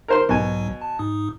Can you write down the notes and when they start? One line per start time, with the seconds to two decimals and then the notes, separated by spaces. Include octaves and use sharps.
0.08 A#4 C5 C6
0.29 B1 G#2 B2 F#3 G#5
0.82 A5
0.99 G#2 D#4 D#6